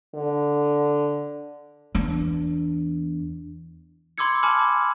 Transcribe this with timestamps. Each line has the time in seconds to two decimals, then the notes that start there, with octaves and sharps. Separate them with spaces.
0.15 D3
1.95 E2 D4
4.18 B5 C6 D6 E6 G#6 C#7
4.43 G#5 A5 B5 D6 F6 F#7